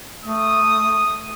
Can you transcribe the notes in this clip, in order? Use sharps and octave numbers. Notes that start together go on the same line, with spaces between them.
A3 D#6